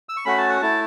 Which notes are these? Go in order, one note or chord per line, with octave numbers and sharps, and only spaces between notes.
E6
C#6
A3 C#4 F#4 B5
A5
F#5
A3 E4 A5